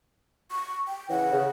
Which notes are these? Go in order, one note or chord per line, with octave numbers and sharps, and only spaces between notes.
C#6
G5
C#3 E3 F#5
C#3